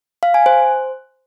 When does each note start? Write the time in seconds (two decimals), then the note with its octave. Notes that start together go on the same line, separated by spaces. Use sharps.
0.23 F5
0.34 G#5
0.46 C5